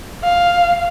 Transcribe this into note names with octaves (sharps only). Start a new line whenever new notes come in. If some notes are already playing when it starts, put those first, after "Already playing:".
F5